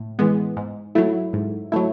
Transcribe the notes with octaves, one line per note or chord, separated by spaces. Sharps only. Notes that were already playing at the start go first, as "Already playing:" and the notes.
Already playing: A2
E3 G#3 B3
G#2
F#3 A3 E4
G#2
F#3 A3 E4